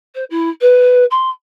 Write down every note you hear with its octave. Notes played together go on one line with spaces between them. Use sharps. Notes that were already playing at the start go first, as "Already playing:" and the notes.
C5
E4
B4
C6